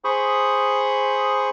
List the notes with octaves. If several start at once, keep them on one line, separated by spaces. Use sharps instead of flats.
G#4 C5 B5 C#6 D#6